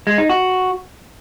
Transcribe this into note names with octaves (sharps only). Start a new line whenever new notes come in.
G#3
D#4
F#4